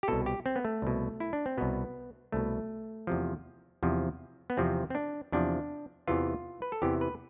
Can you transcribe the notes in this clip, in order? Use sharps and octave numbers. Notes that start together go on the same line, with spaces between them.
G4
C2 B2 A4
G4
C4
B3
A3
C2 B2
E4
D4
C4
C2 B2 B3
C2 B2 A3
E2 C3 F3
E2 C3 F3
B3
E2 C3 F3 C4
C4
D4
E2 C3 F3 D4
E2 C3 E3 F4
B4
A4
E2 C3 E3 G4
B4